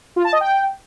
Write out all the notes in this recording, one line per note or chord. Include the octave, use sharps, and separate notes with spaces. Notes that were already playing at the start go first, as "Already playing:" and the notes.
F4
A5
D#5
G5